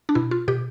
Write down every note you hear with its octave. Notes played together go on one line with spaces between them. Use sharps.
D4
B2 E4
F4
B2 G4